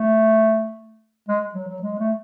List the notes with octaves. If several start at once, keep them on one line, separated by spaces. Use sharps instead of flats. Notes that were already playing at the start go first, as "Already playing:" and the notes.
Already playing: A3
G#3
F#3
F#3
G#3
A3